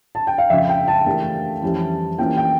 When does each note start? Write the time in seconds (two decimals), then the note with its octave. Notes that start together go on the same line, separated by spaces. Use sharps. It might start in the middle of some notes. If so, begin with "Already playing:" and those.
0.15 A5
0.27 G5
0.38 F5
0.50 F2 C#3 F3 E5
0.69 G5
0.88 A5
1.06 E3 A3 D4 G4 A#4
1.62 F2 E3 G3 C#4 G4
2.18 E3 A#3 C#4 F4 A#4 G5
2.37 G5